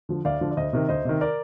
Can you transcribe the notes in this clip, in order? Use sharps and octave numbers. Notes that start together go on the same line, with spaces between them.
D3 F3
D2 D5 F5
D3 F3
D5
D2 C5 D#5
C3 D#3
D2 C5 D#5
C3 D#3
A#4 D5